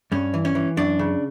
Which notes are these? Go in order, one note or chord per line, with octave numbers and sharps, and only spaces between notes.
G2 C#4
E3
C#4
E3
F#2 D4
C#3